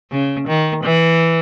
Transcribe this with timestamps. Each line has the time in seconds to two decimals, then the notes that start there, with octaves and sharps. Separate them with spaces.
0.11 C#3
0.48 D#3
0.84 E3